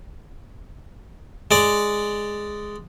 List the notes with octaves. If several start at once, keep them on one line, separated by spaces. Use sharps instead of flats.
G#3 D5